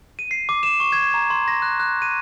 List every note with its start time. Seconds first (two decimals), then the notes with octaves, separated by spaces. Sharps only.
0.19 D#7
0.31 C7
0.49 D6
0.63 E7
0.80 C#6
0.92 G#6
1.14 A#5
1.30 C6
1.48 A#6
1.62 F#6
1.80 F#6
2.02 D#7